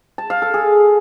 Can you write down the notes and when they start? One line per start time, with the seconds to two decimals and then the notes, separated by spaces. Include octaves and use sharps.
0.18 A5
0.30 F5
0.42 A4
0.54 G#4